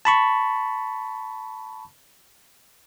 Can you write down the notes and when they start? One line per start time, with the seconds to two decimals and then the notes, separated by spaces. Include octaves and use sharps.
0.05 A5 B5 C#6